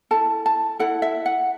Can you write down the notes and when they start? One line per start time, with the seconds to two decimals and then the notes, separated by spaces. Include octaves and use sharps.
0.11 E4 A4 A5
0.46 A5
0.79 E4 A4 F#5
1.02 E5
1.26 F#5